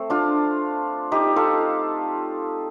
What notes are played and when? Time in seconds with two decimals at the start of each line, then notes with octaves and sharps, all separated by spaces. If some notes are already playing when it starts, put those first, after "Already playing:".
Already playing: A3 C4
0.10 D4 F4
1.12 D#4 G4
1.36 F4 A4